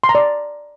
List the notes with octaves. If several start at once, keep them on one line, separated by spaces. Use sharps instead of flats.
C6
A#5
D5